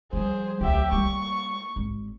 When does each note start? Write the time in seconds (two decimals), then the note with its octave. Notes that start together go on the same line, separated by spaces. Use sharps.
0.13 F3 G3 G#4 C5
0.61 D2 F#3 G4 E5
0.92 G3 A#3 C#6
1.76 G#1